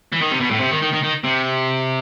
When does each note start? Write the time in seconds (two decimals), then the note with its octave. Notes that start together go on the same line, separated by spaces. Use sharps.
0.12 E3
0.21 D#3
0.31 C3
0.40 B2
0.50 A2
0.60 C3
0.71 D#3
0.82 D#3
0.93 D#3
1.03 D#3
1.24 C3